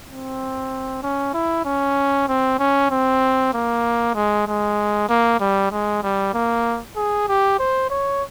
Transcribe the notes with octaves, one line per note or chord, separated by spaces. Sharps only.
C4
C#4
E4
C#4
C4
C#4
C4
A#3
G#3
G#3
A#3
G3
G#3
G3
A#3
G#4
G4
C5
C#5